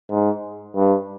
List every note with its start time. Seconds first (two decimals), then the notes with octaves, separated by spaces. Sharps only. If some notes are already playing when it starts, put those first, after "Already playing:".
0.10 G#2
0.76 G2